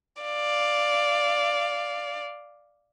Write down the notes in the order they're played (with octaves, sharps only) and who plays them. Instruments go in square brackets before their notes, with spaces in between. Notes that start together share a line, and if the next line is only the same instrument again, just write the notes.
[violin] D5 F5